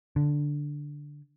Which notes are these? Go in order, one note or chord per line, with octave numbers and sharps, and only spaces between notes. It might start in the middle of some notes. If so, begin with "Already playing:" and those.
D3